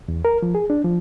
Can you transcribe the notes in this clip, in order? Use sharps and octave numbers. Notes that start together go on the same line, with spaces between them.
E2
A#4
F3
G#4
D4
F3